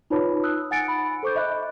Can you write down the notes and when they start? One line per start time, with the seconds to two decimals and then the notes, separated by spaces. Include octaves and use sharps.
0.10 D#4 F4 B4 C#5 A5 B5
0.43 D#6 E6 F#6
0.71 F#5 G#5 A6 C#7 D7
0.88 B5
1.23 A4 C5 C#6 D6 G6
1.35 D#5 E5 B5 F#6